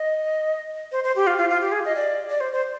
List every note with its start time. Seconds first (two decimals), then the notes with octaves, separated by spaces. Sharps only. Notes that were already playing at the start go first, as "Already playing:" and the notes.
Already playing: D#5
0.92 C5
1.04 C5
1.16 G4
1.27 F4
1.38 F4
1.49 F4
1.61 G4
1.72 G#4
1.85 D#5
1.95 D5
2.29 D5
2.40 C5
2.53 C5